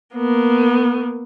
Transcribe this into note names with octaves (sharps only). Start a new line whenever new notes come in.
A#3 B3